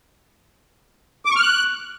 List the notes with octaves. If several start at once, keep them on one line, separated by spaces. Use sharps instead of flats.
D6
C#6
F6
F#6